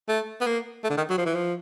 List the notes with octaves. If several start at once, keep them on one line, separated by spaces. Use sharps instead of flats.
A3
B3
A#3
A3
D3
D#3
F#3
F3
E3
F3